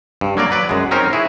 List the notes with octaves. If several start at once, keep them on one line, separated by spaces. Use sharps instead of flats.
G2
F#3 A#3 A#4 D5
F#3 B4 D5
F#2 G#3
C4 C#4 D#4 A#4 C5
E4 F#4 G#4